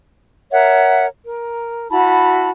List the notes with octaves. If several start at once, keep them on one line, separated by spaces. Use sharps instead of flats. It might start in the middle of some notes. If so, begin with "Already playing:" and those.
A#4 C#5 E5 F#5
A#4
E4 F#4 A5 B5